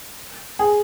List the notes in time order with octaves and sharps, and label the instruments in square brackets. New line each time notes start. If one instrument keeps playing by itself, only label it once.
[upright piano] G#4